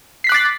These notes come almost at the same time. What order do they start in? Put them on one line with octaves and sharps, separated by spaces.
C7 B6 F#6 D6 A6